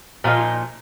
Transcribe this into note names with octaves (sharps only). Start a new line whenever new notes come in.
A#2 F3 C4 D#4 F4